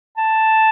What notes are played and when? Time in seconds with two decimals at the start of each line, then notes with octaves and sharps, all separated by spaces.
0.17 A5